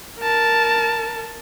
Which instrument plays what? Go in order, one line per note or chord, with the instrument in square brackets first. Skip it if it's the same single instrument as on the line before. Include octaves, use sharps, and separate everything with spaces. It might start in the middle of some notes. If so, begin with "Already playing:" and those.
[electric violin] A#4 A5